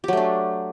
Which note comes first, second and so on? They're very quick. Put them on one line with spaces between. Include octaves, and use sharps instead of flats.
G4 F#3 A3 D4